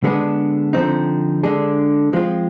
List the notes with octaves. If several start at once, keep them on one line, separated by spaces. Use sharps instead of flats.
D3 G#3 B3 D4 G#4
D3 F3 C4 D#4
D3 G#3 D4 G#4
F3 G#3 C4 F4